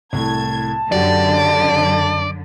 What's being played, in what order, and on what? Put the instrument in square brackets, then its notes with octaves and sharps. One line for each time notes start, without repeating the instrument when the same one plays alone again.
[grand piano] C2 A2 A3 [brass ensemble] A5 [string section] G#6
[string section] F#2 D3 [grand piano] F#4 G4 [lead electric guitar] D5